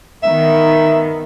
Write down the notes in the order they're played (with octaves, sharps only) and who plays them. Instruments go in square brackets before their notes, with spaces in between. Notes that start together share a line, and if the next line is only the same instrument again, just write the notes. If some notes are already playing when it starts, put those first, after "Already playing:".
[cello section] D#3 B3 [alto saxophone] E5